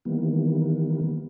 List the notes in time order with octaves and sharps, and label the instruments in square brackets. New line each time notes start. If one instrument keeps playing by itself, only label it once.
[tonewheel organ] D#3 E3 G3 A#3 B3